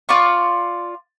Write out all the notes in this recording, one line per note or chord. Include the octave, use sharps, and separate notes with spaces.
F4 D5 C#6